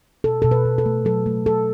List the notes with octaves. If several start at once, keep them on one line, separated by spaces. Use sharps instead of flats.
B2 A4
B2 A4
B4
B2
A4
A3
F#3 A4
A3
A3 A4